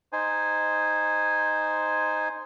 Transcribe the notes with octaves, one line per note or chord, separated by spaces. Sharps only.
D#4 C5 G#5